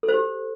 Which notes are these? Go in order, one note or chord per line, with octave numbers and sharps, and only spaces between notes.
A4
C5
G4